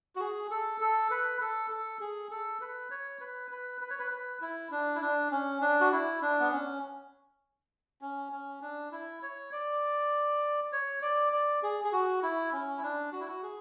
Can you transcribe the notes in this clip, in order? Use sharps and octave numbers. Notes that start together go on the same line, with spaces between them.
F#4
G#4
A4
A4
B4
A4
A4
G#4
A4
B4
C#5
B4
B4
B4
C#5
B4
B4
E4
D4
E4
D4
C#4
D4
F#4
E4
D4
B3
C#4
C#4
C#4
D4
E4
C#5
D5
C#5
D5
D5
G#4
G#4
F#4
E4
C#4
E4
D4
F#4
E4
F#4
G#4